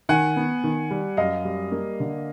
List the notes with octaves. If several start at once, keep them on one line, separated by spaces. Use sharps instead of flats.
D#3 F#5 G#5
B3
D#3
G3
F#2 D#5 F5
G3
A#3
D3